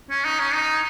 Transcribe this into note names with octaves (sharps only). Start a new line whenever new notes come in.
C#4
D#4
C#4
D#4